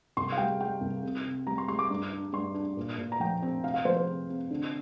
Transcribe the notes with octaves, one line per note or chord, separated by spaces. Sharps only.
C2 C6
F5
G3 G5
G3 G5
C2
C3
C3
G3 A#5
C6
G3 C6
D6
G2
D4
G2 C6
D4
A#2
A#2
A#5
F3 G5
C4
C3 F5
F5
F3 C5
C5
C3
C4
D3